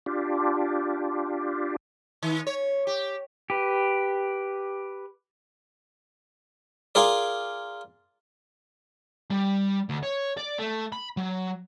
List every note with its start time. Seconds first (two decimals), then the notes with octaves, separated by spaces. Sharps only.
0.06 D4 F4 G4
2.22 D#3
2.47 C#5
2.87 G4
3.50 G4 B4
6.95 F4 G#4 A#4 D5
9.31 G3
9.90 D2
10.03 C#5
10.37 D5
10.59 A3
10.92 B5
11.17 F#3